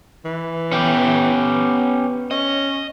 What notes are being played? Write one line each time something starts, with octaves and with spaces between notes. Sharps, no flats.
E3
B3 C#4 G4
C#4 D#5